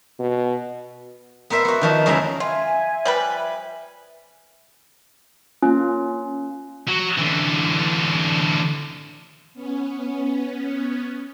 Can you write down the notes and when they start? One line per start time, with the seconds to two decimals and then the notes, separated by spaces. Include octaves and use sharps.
0.19 B2
1.50 B3 A#4 C5 E5
1.65 B3 F#4
1.81 D#3 F3 D#4
2.06 F#2 C#3 G#3 D#4 E4 E5
2.40 F4 E5 G#5
3.05 F3 G3 B4
5.63 A#3 C#4 F4
6.88 F#3
7.19 D3 E3
9.54 B3 C#4